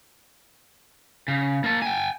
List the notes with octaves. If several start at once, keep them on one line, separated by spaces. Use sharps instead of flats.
C#3
A#3 A5
G5 G#5